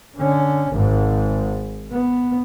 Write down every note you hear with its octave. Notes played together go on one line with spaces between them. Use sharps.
D3 C#4
G#1 G#2
B3